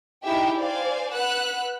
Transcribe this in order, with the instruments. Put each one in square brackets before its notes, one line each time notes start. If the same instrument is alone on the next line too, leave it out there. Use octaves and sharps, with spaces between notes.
[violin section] D#4 E4 G4 G#4 E5 G5
C5 D5 F5 G#5
B4 F#5 E6 F#6